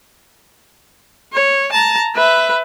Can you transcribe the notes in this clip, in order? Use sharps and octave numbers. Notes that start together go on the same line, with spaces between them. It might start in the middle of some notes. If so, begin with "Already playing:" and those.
C#5
A5 A#5
B4 E5